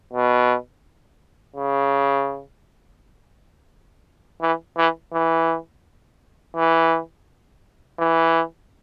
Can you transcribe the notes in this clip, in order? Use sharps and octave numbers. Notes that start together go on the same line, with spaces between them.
B2
C#3
E3
E3
E3
E3
E3